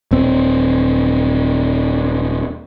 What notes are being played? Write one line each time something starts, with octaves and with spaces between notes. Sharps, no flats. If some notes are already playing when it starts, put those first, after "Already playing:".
D#1 C4